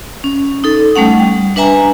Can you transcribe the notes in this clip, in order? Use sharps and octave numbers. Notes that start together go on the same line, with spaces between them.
C#4
D#4 A4
G3 A3 C#4 F#5
G3
D4 B4 E5 G#5 A#5